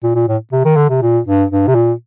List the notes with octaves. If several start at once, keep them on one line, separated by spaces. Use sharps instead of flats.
A#2
A#2
A2
C3
D#3
D3
C3
A#2
G2
G2
C3
A#2